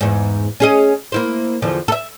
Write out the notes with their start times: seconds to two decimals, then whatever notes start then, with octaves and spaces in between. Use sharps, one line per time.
0.01 E2 G#2
0.60 C#4 G#4 D#5
1.12 A#3 E4 C5
1.62 E2 D3 F3
1.88 A4 E5